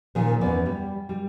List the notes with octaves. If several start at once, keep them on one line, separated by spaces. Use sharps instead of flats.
A#2 D#3 F3 G#4
E2 B3 C#4 D5
G3
G3